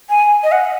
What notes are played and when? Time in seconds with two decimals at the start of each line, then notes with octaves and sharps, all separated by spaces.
0.10 G#5
0.43 D#5
0.52 F#5